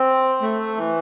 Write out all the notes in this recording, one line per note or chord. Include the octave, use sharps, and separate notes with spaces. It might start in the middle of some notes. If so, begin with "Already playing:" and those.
Already playing: C4
A3
E3